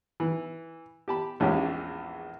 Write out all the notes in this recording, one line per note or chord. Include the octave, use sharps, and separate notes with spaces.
E3
G4 A5 B5
A#1 E2 G#3 C#4 G4